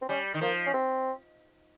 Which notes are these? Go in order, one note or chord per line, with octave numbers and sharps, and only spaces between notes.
C4
G3 C#4
D#3
F3 A#3
C#4
C4